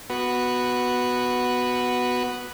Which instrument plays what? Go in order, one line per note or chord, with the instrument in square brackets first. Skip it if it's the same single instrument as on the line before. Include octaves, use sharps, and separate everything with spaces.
[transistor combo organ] B3 F#4 B4